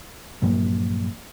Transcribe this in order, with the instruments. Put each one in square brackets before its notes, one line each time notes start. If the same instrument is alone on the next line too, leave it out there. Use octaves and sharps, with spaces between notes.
[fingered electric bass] A#1 G2 F#3 A#3